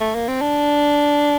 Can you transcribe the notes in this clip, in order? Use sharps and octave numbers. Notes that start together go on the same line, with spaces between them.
A3
A#3
C4
D4